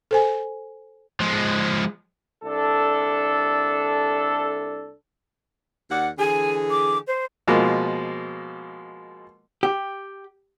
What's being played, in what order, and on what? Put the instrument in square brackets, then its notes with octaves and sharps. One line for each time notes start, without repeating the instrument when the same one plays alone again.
[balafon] A4 C5 G#5
[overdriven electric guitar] F3 G#3
[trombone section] C2 D4 A4
[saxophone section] D#2 D5 F#5
[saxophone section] D3 E3 G#4 [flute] G#5
[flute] D6
C5
[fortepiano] B2 F3 G#3 A#3
[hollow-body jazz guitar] G4